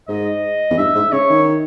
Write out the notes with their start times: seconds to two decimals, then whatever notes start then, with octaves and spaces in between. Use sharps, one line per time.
0.09 G#2 D#5
0.71 E2
0.78 G2 E5
0.95 G#2
1.12 C#3 C#5
1.30 D#3